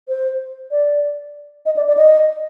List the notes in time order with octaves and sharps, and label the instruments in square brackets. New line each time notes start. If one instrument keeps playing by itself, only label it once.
[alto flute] C5
D5
D#5
D5
D5
D#5